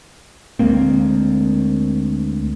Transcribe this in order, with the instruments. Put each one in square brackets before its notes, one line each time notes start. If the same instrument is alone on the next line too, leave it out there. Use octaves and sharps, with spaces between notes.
[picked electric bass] D2 G#3 A#3 C4